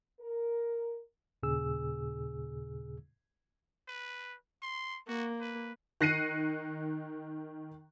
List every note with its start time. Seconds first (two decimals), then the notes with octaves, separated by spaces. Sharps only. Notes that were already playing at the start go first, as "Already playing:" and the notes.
0.20 A#4
1.43 D#2 A#2 C#3 G#4 E6
3.88 B4
4.62 C6
5.08 A#3 F#4
5.40 B4
6.01 D#3 F#6 A#6 C7 C#7 D#7